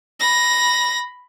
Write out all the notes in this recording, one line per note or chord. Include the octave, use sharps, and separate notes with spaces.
B5 A#6